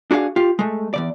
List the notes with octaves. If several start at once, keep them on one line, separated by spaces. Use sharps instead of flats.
D4 F#4 G#4 C#5 F5
F4 G4
G#3 A3
E2 C#3 D5